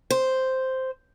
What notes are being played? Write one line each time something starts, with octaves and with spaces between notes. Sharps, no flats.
C5